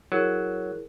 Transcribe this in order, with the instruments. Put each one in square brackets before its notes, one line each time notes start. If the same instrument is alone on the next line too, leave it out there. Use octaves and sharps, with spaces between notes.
[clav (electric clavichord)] F#3 [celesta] E4 G#4 A#4